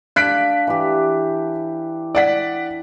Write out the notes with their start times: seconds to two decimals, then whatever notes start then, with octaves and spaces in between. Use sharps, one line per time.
0.16 D4 F5 A5 F#6 B6 D7
0.67 E3 G4
2.15 D5 F#5 B6